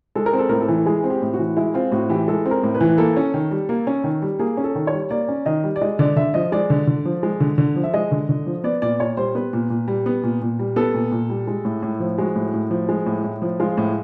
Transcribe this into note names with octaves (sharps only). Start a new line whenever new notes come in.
G#3 A4
A#4
C4
A4
A2 A#4
A4
E3
G#3 G#4
C4
G4
A2
F#4
E3
G#3 E4
C4 F4
A2 F#4
E3 G4
G#3 A4
C4
A#4
A2
B4
E3
A#3 A4
C#4
D#3
G3
A#3
C#4
D#3
G3
A#3 G#4
C#4
A4
D#3
C#5
G3
A#3 D5
C#4
D#3 D#5
G3
D5
G#3 D#5
D3 D5
D3 E5
F3 D#5
G#3 D5
D3
D3
F3
G#3
D3
D3
F3
E5
G#3 D#5
D3
D3
F3
B3 D5
A#2 D5
A#2 C#5
G3 C5
B3 B4
A#2
A#2
G3
B3
A#2
A#2
G3
B3 A4
A#2
A#2
G3
G#3
A2
A2
F3
G#3 F#4
A2
A2
F3
G#3
A2
A2
F3
G#3 F4
A2